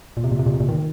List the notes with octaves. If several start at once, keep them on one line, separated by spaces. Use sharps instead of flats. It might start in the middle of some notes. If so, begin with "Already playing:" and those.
A#2
C3
A#2
C3
A#2
C3
A#2
D#3